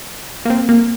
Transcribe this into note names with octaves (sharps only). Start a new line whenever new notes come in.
A#3
C4
A#3